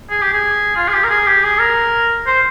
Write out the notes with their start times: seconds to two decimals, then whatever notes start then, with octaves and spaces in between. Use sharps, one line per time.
0.10 G#4
0.22 G4
0.33 G#4
0.76 F4
0.88 G#4
0.93 G4
1.04 A#4
1.10 G#4
1.27 G4
1.43 G#4
1.59 A#4
2.26 C5